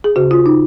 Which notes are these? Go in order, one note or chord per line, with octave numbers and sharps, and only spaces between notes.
G#4
D#2 C#3 F#4
F4
D#4